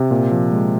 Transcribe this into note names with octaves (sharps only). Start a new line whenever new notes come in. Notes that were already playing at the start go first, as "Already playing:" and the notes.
Already playing: C3
A#2
F3
G#3